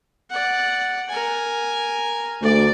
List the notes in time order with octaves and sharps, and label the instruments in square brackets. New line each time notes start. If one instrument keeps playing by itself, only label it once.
[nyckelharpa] D5 F#5
A#4 G#5
[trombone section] D2 [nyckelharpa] D5 D6